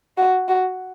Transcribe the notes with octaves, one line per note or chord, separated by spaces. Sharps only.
F#4
F#4